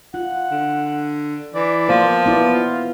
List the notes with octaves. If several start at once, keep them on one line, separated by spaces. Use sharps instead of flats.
F4 F#5
D3
E3 D5
F3 A#3 B3 C5
B3 E4 F#4 D5
F4